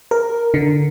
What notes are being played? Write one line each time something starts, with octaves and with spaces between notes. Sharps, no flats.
A#4
D3